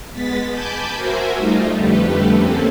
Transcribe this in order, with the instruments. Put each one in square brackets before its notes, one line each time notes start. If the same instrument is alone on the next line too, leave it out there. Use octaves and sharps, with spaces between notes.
[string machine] G#3 B3 A6 B6
G#5 A5 B5 D6 G6
F#4 A#4 C5 E5 G#5
G3 A3 D#4 F4
F2 D3 G3 A3 G4 B4
A#3 C4 C#4 A4